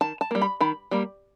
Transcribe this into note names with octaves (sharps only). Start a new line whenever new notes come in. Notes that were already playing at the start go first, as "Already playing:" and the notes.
D#3 A5
A5
G3 A#3
B5
D#3 B5
G3 A#3